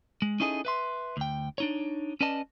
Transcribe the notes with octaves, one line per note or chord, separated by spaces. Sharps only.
G#3
C#4 D#4 E4 G#4 A4 D#5
B4 E5 C6
D2 G5
D4 D#4 C#5
C#4 B4 D5 D#5 A5